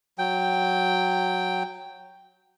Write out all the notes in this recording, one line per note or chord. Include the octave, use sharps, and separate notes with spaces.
F#3 G5